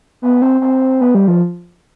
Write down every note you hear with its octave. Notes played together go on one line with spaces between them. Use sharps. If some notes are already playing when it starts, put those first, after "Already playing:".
B3
C4
C4
B3
G3
F3